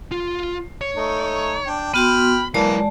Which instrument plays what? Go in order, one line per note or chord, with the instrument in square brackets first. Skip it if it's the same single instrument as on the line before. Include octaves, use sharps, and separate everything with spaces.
[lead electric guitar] F4
C#5
[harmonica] A3 D#4
D4 G5
[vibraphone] B3 F#4 C6 [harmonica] G5 F6 [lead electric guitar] B5
[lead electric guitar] F#3 E4 [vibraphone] G#3 D5 A5 [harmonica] A#3 B4